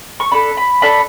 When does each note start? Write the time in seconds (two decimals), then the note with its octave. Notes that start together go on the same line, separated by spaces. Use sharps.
0.20 C#6
0.31 D4 A4 B5
0.57 B5
0.82 D4 A4 B5